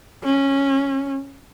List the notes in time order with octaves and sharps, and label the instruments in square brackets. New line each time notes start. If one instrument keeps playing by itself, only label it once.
[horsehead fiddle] C#4